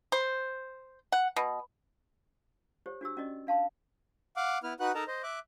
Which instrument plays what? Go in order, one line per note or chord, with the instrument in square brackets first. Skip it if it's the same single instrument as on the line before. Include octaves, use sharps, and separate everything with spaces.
[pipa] C5
F#5
B2
[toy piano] G4 C5 C#5
D4 F#4 G4 E6
C#4 F#4 D5 D#5
D4 F5 A5 C6
[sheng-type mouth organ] F5 F#5 D6
B3 E4 B4 F6
D#4 F#4 B4 F#5 F#6
D#4 A4 A#4 D#5 A5 A#5
C5 D#5
E5 D6 F#6